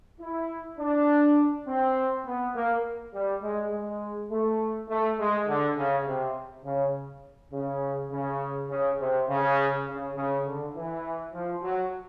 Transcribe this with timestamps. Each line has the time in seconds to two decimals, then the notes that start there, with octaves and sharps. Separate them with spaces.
0.20 E4
0.79 D4
1.66 C4
2.25 B3
2.54 A#3
3.13 G3
3.42 G#3
3.71 G#3
4.30 A3
4.89 A3
5.19 G#3
5.48 D3
5.77 C#3
6.06 C3
6.64 C#3
7.52 C#3
8.10 C#3
8.70 C#3
8.99 C3
9.28 C#3
9.86 C#3
10.16 C#3
10.45 D3
10.74 E3
11.33 F3
11.62 F#3